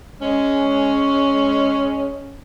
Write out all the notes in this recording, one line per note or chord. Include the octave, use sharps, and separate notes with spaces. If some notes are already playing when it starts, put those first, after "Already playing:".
G#3 C#4